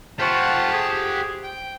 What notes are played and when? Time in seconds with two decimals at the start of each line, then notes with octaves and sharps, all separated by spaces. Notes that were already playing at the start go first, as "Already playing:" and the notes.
0.20 F4 G4 C5 F#5 A5 C#6
0.73 G#4
1.43 G5